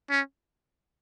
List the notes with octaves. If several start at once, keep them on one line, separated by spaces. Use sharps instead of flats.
C#4